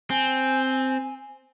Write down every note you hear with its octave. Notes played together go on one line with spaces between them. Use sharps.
C4 G#5